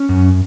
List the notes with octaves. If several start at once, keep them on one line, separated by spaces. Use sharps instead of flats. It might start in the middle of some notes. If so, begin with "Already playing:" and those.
Already playing: C#4
F#2